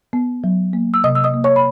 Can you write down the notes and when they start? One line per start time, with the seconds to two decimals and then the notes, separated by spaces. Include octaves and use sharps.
0.13 B3
0.44 F#3
0.73 A#3
0.94 E6
1.04 C3 D#5 D#6
1.15 E6
1.24 D#5 D#6
1.34 A#3
1.44 C#5 C#6
1.56 B5